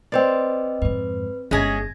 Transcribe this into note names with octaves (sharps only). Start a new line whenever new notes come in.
C4 B4 C5 D5 D#5 G5
F2 G#2 B4
G1 G#3 C#4 G#4 G#6 A#6